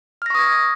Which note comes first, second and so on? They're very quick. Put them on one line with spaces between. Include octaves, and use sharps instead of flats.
F6 A#6 C#6 D#6 G#6